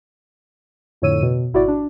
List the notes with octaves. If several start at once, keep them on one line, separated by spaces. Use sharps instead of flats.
F2 A2 D3 C#5 E6 D#7
B2
G#1 E4 F#4 D5
D4